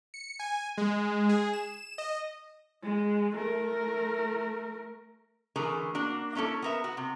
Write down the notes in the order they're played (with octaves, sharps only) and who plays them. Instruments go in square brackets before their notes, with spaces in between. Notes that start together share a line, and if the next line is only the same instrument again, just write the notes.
[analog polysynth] C#7
G#5
G#3
G#4
E7
D#5
[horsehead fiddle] G#3
A3 A#4
[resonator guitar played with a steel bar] D3 E3 A3 G#4 A#4
A#3 D4 F#4
A#3 C#4 E4 A4
B3 A#4 E5
F#4
C3